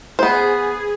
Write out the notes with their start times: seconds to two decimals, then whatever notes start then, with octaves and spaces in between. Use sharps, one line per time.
0.19 B3 G#4 C5